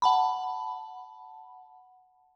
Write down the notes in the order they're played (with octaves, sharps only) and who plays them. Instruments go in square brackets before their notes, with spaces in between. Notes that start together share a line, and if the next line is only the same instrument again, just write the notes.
[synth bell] F#5 A5 B5